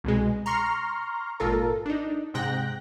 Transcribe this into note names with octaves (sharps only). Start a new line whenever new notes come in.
C2 B2 G#3
A#5 C6 C#6 F6
G#1 A#2 F4 A4 A#4
D4 D#4
G#2 C3 G5 F#6 A#6